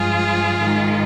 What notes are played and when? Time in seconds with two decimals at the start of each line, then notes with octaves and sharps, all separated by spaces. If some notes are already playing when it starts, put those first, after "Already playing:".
Already playing: G2 F3 G#3 F4 G#4
0.60 G#2 D#3 G#3